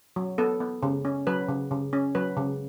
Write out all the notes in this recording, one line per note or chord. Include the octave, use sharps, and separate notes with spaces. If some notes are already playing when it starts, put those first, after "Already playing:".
F#3
B3 A4
B3
C#3
C#4
F#3 B4
C#3
C#3
C#4
F#3 B4
C#3